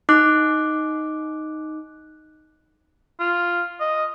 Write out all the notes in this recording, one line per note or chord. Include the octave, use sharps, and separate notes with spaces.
D#4 D6 F#6
F4
D#5